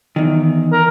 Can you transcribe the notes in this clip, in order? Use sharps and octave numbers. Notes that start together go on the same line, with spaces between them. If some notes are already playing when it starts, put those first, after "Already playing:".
E2 D#3
A#4